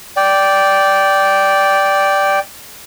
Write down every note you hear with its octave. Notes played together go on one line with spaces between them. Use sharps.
D5 G5